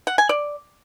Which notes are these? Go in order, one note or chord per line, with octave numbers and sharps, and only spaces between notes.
F#5
G#5
D5